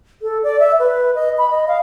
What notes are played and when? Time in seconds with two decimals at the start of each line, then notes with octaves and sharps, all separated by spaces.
0.22 A4
0.43 D5
0.60 E5
0.79 B4
1.15 D#5
1.38 B5
1.51 D#5
1.68 F5